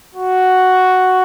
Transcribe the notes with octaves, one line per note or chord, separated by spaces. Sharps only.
F#4